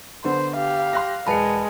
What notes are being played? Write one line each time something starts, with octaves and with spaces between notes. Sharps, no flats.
D3 B3 C5
G4 F5
C6 F#6 A#6
E1 G#3 B4 A5 B5 C#7